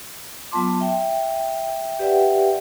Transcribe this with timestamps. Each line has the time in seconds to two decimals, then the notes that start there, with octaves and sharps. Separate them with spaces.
0.51 F#3 B3 F4 A5 C6 D6
0.80 E5 G5
1.99 G4 B4 D5 E5 F#5 G5